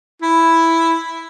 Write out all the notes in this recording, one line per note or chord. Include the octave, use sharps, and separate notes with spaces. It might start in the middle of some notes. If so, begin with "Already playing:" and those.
E4